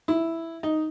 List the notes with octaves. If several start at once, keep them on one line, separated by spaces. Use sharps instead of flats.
E4
D#4